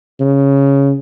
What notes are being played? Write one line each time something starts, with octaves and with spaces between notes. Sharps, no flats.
C#3